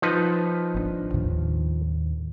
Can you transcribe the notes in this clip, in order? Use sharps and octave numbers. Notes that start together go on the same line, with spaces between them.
F3 D#4 B4
G#1 C4 D4
D#2 A2 D#3